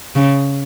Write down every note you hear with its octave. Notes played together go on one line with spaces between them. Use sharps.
C#3